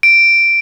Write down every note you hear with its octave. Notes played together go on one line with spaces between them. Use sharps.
D7